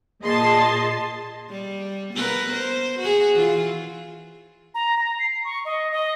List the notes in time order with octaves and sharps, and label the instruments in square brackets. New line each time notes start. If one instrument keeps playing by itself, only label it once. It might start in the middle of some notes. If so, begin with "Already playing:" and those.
[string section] A#2 C6 [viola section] G#4 D#5 A5
[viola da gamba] G3
B3 A#4 B4
C5
F#4 G#4
E3 F4
[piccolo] A#5
A#5
C7
C#6
D#5
D#5